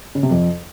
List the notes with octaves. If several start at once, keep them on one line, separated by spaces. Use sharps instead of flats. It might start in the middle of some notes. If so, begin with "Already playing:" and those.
C#3
C3
F2